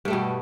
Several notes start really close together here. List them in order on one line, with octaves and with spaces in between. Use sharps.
G2 A3 G3 B2